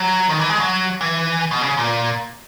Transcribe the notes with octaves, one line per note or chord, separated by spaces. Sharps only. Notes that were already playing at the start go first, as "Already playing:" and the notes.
Already playing: F#3
D#3
E3
G#3
F#3
E3
B2
C#3
A#2